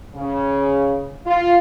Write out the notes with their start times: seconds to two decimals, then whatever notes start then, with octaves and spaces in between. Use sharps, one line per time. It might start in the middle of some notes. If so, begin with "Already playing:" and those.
0.14 C#3
1.25 F4